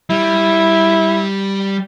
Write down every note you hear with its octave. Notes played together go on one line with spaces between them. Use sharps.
G3 E4